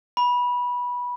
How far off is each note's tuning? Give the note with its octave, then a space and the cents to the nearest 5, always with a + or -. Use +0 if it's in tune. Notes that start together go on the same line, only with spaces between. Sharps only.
B5 -15